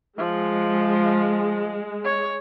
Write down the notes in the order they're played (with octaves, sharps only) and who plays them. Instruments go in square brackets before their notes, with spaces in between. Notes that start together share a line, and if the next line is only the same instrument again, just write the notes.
[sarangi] F3 [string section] G#3
[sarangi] C#5